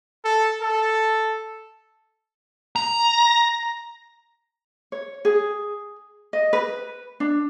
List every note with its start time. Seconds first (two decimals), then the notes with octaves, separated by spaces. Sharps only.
0.25 A4
0.62 A4
2.76 A#5
4.92 C#5
5.25 G#4
6.33 D#5
6.53 B4
7.20 D4